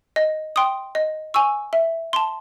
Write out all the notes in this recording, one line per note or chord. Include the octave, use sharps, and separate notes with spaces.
D#5
G5 C6 D#6
D#5
G#5 C#6 E6
E5
A5 C6